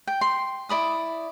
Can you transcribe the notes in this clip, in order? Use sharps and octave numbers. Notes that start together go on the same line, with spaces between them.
G5
C6
E4 D5 B5 D#6